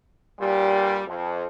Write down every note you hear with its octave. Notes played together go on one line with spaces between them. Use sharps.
G2 A#2 G3
F2